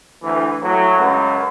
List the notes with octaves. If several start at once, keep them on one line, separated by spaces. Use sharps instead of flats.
D2 E3
A2 F#3
C#2 F#2